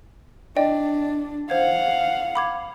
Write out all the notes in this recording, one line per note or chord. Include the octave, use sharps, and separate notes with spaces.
D4 D5 D#5 G5
C5 F5 F#5 G#6
B5 D6 G#6